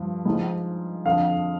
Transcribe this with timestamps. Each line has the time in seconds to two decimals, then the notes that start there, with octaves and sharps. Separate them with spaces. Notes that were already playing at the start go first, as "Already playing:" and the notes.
Already playing: G2 F3
0.25 G#2 F3
1.05 F2 D3 F3 F5